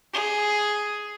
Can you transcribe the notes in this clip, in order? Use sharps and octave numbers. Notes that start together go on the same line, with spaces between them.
G#4